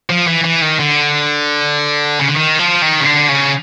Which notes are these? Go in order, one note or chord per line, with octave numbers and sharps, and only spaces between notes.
F3
E3
E3
D#3
D3
C#3
D3
D#3
F3
D#3
C#3
D3
C#3